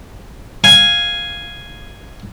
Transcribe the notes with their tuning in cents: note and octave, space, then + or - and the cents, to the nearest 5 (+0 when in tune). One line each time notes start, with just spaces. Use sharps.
F5 +0 G#5 +0